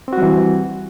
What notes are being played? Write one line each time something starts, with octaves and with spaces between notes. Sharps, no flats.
E3 G3 C4 F#4